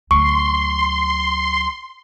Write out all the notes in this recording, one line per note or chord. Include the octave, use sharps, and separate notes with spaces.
D2 F#3 C6 C#6